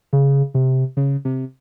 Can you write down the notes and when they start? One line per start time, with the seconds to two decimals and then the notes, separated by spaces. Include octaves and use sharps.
0.13 C#3
0.54 C3
0.97 C#3
1.25 C3